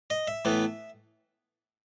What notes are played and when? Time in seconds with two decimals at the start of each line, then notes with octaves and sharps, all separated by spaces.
0.10 D#5
0.27 E5
0.45 A2 E3 B3